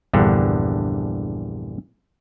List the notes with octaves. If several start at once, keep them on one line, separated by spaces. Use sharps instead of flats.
A#1 E2 G2 D3